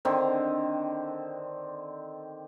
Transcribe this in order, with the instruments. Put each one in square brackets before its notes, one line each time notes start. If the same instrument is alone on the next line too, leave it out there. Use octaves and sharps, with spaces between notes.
[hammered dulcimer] D3 D#3 C4